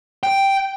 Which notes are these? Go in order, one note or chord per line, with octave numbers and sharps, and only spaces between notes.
G5